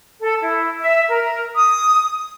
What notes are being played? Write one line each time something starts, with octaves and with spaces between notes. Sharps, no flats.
A4
E4
E5
A#4
D#6